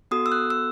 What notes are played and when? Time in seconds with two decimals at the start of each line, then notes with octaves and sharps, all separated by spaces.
0.11 B3 F#4 A4 D#6
0.26 E6
0.32 F#6
0.50 E6